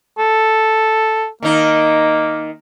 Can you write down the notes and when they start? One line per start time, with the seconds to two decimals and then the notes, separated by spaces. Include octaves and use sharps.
0.19 A4
1.43 D#3 A#3 D#4